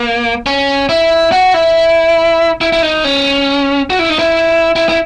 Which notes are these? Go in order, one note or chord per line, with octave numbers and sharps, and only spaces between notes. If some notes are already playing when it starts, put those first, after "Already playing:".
Already playing: A#3
C#4
E4
F#4
E4
E4
E4
D#4
C#4
F#4
E4
D#4
E4
E4
E4